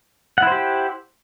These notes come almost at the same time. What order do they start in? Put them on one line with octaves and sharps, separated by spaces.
F#5 E4 C5 G4